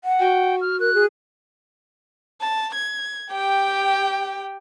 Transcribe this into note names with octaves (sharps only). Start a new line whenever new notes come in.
F#5
F#4 G5
F6
A#4 F#6
G#4
A5
G#6
G4 G5